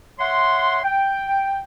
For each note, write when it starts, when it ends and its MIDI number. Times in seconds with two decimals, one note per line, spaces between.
0.19 0.79 73
0.19 0.79 76
0.19 0.79 78
0.19 0.79 84
0.83 1.59 79